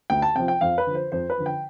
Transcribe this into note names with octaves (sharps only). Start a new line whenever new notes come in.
D2 G5
A5
C3 F3 G5
G5
F2 F5
B4
D3 F3
C5
F2 C5
B4
D3 F3
G5